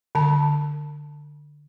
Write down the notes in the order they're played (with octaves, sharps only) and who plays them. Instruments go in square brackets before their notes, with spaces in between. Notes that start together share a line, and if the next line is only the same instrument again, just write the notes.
[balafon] D3 A5